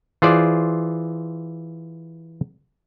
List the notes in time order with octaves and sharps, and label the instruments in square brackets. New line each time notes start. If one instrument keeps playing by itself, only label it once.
[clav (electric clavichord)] E3 F4 G#4 C5 D5